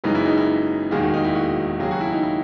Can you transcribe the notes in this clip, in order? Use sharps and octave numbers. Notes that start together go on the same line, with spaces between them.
F#1 F#2 C#3 E3 G#3 D#4
E4
D#4
E4
E1 D#2 D#3 A#3 G#4
F#4
D#4
E4
F#4
D#2 C#3 F#3 A#3 G#4
F#4
E4
D#4
E4